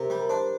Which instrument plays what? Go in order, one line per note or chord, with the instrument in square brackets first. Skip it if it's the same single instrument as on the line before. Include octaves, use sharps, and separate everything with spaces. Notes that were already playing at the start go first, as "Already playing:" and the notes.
Already playing: [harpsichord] C3 [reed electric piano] A#4
[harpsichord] G3
[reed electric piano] A#4
[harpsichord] D4 [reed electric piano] C5